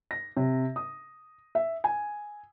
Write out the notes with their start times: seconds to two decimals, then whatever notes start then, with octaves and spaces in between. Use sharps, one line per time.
0.11 A#6
0.37 C3
0.76 D#6
1.55 E5
1.84 G#5